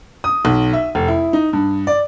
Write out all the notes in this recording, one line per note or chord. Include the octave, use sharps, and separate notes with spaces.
D#6
B1
E5
F1
E4
D#4
G2
D5